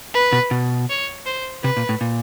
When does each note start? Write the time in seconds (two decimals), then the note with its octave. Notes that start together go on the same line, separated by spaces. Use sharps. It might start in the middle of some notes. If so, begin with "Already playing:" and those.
0.14 B4
0.33 B2
0.51 B2
0.90 C#5
1.26 C5
1.64 C3 B4
1.77 A#2
1.89 A2
2.01 A#2